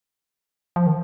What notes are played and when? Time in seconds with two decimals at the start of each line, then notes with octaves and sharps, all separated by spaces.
0.76 F3
0.87 D#3